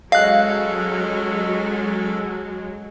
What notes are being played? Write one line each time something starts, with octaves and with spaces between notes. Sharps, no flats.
F#3 G#3 C#4 A4 D#5 F5 F#6